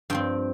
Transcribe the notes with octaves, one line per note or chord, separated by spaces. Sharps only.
G2 F3 C4 G5